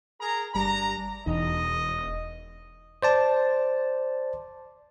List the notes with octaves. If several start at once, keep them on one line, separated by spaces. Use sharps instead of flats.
G#4 A#4 A#5
G1 G3 D4 A#5
E1 E2 D#4 D#5
C5 D5 A5